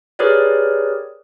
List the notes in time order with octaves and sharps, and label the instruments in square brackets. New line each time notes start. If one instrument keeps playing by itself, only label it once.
[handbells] G4 G#4 A#4 B4 C#5 D5